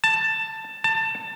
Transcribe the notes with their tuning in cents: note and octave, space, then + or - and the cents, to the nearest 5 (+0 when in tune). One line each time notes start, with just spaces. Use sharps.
A5 +10
A5 +20